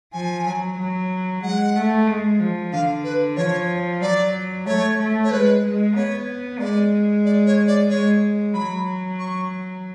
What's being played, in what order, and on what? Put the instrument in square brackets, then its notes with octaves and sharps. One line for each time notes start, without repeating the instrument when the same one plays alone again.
[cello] F3 [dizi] G#5
[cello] F#3
F#3
[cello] G#3 [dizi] F#5
[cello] A3
G#3
F3
[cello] D3 [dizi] F5
[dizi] B4
[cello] F3 [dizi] C#5
[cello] F#3 [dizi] D5
[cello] A3 [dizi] C#5
[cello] A3
[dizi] C#5
[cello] G#3 [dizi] B4
[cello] G#3
[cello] B3 [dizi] C#5
[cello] G#3 [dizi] D5
[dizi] D5
C#5
D5
[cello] G#3 [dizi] C#5
[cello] F#3 [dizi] B5
[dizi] C#6